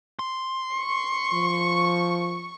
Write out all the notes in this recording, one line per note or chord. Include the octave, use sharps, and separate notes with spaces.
C6
C#6
F3